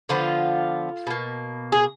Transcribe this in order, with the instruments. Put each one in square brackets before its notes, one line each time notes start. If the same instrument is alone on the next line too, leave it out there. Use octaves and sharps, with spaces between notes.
[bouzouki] D3 F3 B3 F4
B2 A#3
G#4